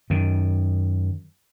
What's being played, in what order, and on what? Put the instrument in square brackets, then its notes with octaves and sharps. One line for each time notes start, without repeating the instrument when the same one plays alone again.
[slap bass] F#2 D#3